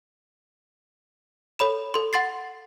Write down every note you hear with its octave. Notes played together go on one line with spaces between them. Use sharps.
A4 C#5 B5 E7
A4 C6
F#5 C6 A6 C7